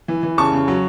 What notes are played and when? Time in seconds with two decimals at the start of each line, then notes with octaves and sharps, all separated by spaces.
0.08 E3
0.23 E3
0.38 C#3 A5 C#6
0.53 C#3
0.68 F#3